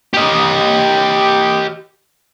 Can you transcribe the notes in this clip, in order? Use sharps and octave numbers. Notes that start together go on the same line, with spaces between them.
G4 D#5